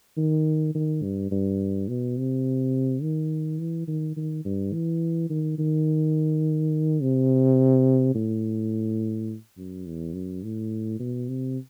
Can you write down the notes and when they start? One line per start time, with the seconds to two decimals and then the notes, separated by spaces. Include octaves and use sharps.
0.17 D#3
0.75 D#3
1.03 G2
1.31 G2
1.88 B2
2.17 C3
3.02 D#3
3.60 E3
3.88 D#3
4.17 D#3
4.45 G2
4.73 E3
5.30 D#3
5.58 D#3
7.01 C3
8.15 A2
9.57 F#2
9.86 E2
10.14 F#2
10.43 A2
11.00 B2
11.28 C3